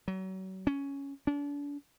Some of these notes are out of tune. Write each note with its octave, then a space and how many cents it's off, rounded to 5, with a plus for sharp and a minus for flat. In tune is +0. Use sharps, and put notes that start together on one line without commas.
F#3 +35
C#4 +5
D4 -40